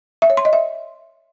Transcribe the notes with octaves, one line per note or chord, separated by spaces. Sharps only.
E5
C#5
C6
D#5
E5